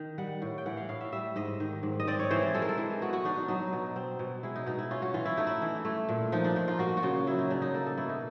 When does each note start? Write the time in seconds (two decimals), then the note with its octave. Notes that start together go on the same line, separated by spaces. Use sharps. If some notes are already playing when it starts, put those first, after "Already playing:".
Already playing: D#3
0.18 G3 F#5
0.42 A2
0.58 G5
0.66 E3 F#5
0.77 F5
0.89 A2 F5
1.01 E5
1.12 G3 E5
1.36 G#2 D#5
1.60 D#3
1.83 G#2
2.00 D#5
2.07 C4 D5
2.19 C#5
2.31 E3 C5
2.43 D5
2.54 G#3 A4
2.62 A#4
2.69 A4
2.78 E3
3.02 B3 F#4
3.13 F#4
3.25 D4 D#4
3.37 D#4
3.48 F#3 D#4
3.73 B2
3.96 C4
4.19 B2
4.43 G#3 E4
4.55 D#4
4.66 B2 D#4
4.79 E4
4.91 C#4 F4
5.02 F#4
5.14 E3 F4
5.25 E4
5.37 A3 D#4
5.47 E4
5.62 E3
5.85 A3
6.09 A#2
6.32 F3 D#4
6.44 D4
6.56 A#2 D#4
6.68 F4
6.79 A#3 F#4
6.97 F#4
7.03 C#3 F4
7.27 F#3 E4
7.38 D#4
7.50 C#3 D4
7.62 D#4
7.74 A#3 A4
7.86 A4
7.97 B2 E4
8.09 D#4